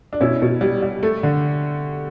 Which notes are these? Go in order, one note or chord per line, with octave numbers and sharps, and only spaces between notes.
D4
B2 C#4 E4
B2
G3
G3
A3
D3